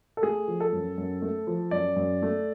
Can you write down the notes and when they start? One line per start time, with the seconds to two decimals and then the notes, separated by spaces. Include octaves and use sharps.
0.17 A4
0.23 A3 G#4
0.48 F3
0.60 A4
0.73 F#2
0.98 F#2
1.22 A3
1.47 F3
1.71 F#2 D5
1.96 F#2
2.22 A3